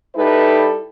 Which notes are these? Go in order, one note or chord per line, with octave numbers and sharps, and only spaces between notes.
G3 D#4 E4 A4 B4